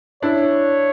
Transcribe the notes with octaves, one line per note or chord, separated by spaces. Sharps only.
D4 E4 C#5